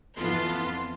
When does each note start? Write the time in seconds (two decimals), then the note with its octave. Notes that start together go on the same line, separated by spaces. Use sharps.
0.17 F2 E3 B3 F4 A5 C6